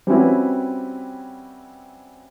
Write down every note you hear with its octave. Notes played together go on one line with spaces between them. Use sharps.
G3 C4 C#4 E4 F#4 B4